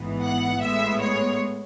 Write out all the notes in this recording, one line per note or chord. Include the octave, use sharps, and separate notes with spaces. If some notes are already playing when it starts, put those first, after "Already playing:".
Already playing: A1 G#2 E3 B3
F#5
A2 G#3 B3 E5
C#5